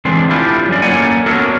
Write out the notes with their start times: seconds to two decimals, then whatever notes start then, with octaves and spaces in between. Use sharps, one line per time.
0.05 D3 E3 G#3 C4 D4
0.30 A3 E4 F4 G4
0.69 F#3 C#4 D5
0.82 A3 A#3 C#4 C#5 F#5 G#5
1.26 B3 D4 F#4 A4 A#4 C#5